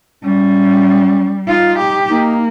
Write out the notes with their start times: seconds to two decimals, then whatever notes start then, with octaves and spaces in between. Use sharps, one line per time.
0.23 G3 C#4
1.47 D#4 F4
1.78 G4
2.09 A#3 D#4